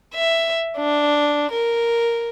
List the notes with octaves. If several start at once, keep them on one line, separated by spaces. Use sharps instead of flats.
E5
D4
A#4